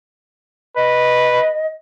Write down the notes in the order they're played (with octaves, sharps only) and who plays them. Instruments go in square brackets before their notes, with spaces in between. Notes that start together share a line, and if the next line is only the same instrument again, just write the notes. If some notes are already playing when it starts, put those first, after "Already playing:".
[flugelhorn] B4 [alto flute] D#5